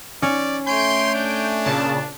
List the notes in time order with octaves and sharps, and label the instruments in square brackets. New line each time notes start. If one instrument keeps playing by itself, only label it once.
[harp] C#4 [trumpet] D5
[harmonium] A3 C#5 G#5 [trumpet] C6 [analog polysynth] G6 D7
[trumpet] D4
[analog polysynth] A#2 C#3 A5